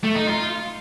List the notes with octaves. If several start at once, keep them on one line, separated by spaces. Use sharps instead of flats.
A3
D#4
F4